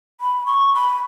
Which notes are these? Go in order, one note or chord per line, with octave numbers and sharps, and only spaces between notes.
B5
C#6
B5